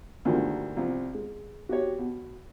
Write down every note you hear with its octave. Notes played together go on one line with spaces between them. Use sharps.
D2 G2 B2 D#3 F3 A#3
C2 F3
G#3
F#4 G4 C#5
B2